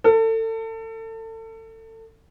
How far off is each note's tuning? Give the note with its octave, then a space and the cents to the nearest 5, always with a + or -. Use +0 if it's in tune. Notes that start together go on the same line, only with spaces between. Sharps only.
A4 +30